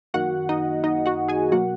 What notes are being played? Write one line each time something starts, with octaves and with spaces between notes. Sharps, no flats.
F#2 D#3 A#3 F#4 F#5
D#4 D#5
D#4 D#5
F#4 F#5
G#4 G#5
B2 F#3 A#3 F#4 F#5